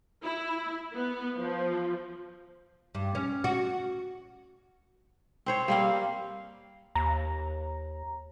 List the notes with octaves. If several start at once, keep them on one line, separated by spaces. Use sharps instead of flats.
E4
B3
F3
G2
C#4
F#4
C4 C5 C#5
G3 A#3 C4 F5
D#2 A#5